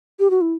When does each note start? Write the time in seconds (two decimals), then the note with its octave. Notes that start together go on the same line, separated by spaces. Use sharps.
0.19 G4
0.30 F#4
0.41 E4